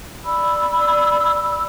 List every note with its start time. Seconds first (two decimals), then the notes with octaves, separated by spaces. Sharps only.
0.24 D5 B5 E6